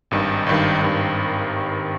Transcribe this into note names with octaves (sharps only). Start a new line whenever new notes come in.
G#1 G2 D#3
G#1 G2 D#3
G#1 G2 D#3